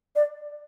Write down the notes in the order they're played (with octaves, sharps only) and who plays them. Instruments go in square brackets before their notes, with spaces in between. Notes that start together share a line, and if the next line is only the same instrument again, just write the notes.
[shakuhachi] D5